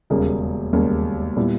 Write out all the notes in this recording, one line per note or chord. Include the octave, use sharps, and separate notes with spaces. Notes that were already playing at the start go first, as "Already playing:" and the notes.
E1 D#2 C#3 G3 A#3
E1 D#2 C#3 G3 A#3
A#2 G3 B3 E4